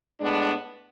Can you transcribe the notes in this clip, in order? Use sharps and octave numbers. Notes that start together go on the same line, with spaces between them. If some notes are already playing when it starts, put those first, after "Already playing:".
A2 G#3 B3 D4